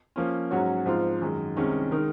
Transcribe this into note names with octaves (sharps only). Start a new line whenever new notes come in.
F3 A#3 C#4
G#2 F#3 C#4 F#4 C#5
G#2 F3 C4 F4
F#2 D#3 G#3
C2 C3 D#3 G#3 C#4
D#3 G#3 D#4 A#4